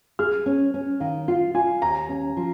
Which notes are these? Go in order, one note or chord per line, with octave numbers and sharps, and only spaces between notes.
G#4 F6
C#4
C#4
D#3 F5
F4 F5
F4 G#5
D#2 A#5
C#4
F3